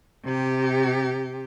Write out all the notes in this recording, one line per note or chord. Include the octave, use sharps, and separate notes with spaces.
C3 G4